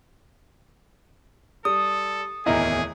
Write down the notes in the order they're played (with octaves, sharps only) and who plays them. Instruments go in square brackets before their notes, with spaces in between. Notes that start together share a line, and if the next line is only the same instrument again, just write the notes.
[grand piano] G3 [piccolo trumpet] A4 [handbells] D#6
[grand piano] D1 E2 D#3 [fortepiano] E4 D#5 A#5 [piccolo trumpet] G#4